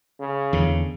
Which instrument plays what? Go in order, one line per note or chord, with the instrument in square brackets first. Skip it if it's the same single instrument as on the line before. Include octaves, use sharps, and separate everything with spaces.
[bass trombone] C#3
[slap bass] E2 D3